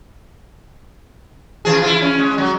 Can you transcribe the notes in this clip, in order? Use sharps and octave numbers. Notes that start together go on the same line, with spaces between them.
C#3 E3 G#4
E4 F4
C#4
G#3
F#3